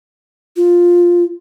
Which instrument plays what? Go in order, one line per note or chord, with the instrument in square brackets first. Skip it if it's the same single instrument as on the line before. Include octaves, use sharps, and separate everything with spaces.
[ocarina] F4